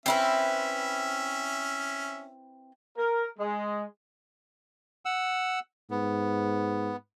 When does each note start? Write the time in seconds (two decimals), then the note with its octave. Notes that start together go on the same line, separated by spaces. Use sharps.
0.06 C4 C#4 E4 B4 E5
2.97 A#4
3.38 G#3
5.05 F#5 E6
5.90 G#2 B3